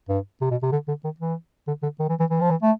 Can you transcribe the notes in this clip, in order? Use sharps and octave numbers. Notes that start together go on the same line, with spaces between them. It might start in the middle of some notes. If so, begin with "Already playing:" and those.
G2
C3
B2
C3
D3
D3
D#3
E3
D3
D3
D#3
E3
E3
E3
F3
E3
A3